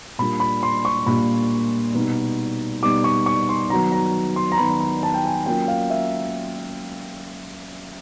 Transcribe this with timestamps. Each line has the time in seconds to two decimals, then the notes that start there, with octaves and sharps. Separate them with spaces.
0.18 A#2 G3 A#3 D4 F4 B5
0.40 B5
0.63 C6
0.85 C#6
1.06 A#2 G3 A#3 D4 F4 B5
1.94 B2 G3 B3 D#4
2.83 B2 G3 B3 D#4 D6
3.04 C#6
3.26 C#6
3.49 C6
3.70 D#3 F#3 B3 A#5
3.92 A#5
4.36 C6
4.52 A#5
4.58 D#3 F#3 B3 B5
4.80 A#5
5.03 A5
5.14 G5
5.25 G#5
5.46 F#3 A#3 C#4 F4 G5
5.68 F5
5.90 E5